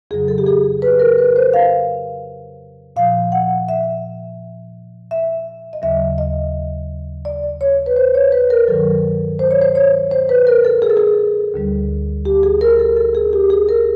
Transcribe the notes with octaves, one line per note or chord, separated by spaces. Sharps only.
F2 C#3 F#3 G#4
A4
G4
G#4
B4
A#4
B4
C5
F5
A#2 F3 F5
F#5
E5
E5
D#5
D#2 C#3 F#3 E5
D#5
D5
C#5
B4
C5
C#5
B4
A#4
G2 D#3 F#3 A4
C5
C#5
C5
C#5
C5
B4
A#4
A4
G#4
A4
G#4
D2 D3 G3
G4
G#4
A#4
A4
A4
G#4
G4
G#4
A#4